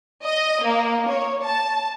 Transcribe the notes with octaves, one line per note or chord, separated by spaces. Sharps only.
D#5
A#3
C#5
A5